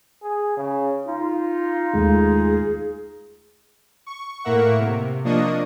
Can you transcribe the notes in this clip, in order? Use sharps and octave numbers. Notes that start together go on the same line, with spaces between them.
G#4
C#3
D#4 F4
D#2 G#3 A3 F4 G#4
C#6
A2 A#3 A#4 E5 F#5 C#6
C3
F3 A#3 D4 D#5 C#6 D#6